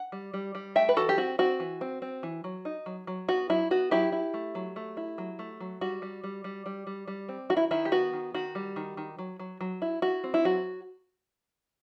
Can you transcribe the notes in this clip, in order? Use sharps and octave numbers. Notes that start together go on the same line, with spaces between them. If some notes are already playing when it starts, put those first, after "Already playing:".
Already playing: F#5
G3
G3
G3
A3 E5 G5
B4
E3 F#4 A4
G4
C4 F#4
C4 F#4
E3
C4
C4
E3
F#3
D#4
F#3
F#3
B3 F#4
F#3 E4
B3 F#4
F#3 E4 G4
E4
A3
F#3
A3
E4
F#3
A3
F#3
G3 F#4
G3
G3
G3
G3
G3
G3
C4
D#3 F#4
E4
D#3 E4
G4
B3 F#4
D#3
D#3 F#4
G3
D#3
D#3
F#3
F#3
F#3
E4
E4 F#4
C4
E4
F#3 F#4